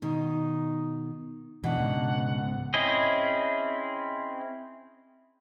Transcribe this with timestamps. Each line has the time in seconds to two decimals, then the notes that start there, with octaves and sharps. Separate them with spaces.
0.02 B2 D#3 D#4
1.64 D2 B2 E3 D4 F#5
1.78 G#2 C#3
2.74 C4 C#4 E4 G#4 D#5